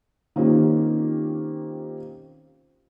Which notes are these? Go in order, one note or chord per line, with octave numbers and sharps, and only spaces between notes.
D#3 A#3 C4 C#4 F4 G4